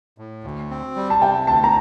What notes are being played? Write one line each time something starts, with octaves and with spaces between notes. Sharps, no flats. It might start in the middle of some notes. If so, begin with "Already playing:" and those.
A2
D2
C4
G3
A5
C3 G5
D2 A5
A#5